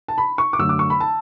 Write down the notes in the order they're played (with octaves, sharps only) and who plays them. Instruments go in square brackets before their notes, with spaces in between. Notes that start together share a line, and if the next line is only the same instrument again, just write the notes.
[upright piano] A5
B5
C#6
D6
F#2 D3 A3 E6
D6
C#6
B5
A5